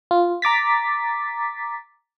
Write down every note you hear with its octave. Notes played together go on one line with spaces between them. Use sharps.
F4
A#5 D6 A6 B6